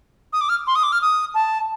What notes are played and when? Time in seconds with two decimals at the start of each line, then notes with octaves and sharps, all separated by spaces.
0.33 D#6
0.41 D6
0.49 F6
0.67 C6
0.75 D#6
0.83 D6
0.92 F6
1.01 D#6
1.34 A5